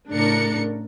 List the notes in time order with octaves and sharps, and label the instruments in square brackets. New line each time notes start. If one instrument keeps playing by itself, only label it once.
[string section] A2 C#3 D4 A#4 D5 C#7